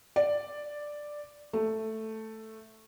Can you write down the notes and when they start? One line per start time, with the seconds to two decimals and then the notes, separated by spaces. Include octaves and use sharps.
0.16 D5
1.53 A3